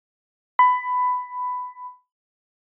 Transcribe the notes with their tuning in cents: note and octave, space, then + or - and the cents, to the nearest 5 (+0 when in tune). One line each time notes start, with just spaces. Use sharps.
B5 +15